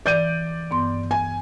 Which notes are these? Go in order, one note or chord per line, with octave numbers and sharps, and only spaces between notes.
E3 D5 G6 D#7
G2 B3 C6
G#5